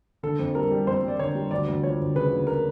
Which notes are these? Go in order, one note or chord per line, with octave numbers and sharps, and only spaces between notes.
D3 A4
F2
G3 A#4
G3
F2 C5
G3 D5
D3 C#5
G3
D2 D5
D2
F3 C#5
D2
C#3 B4
D2
A#4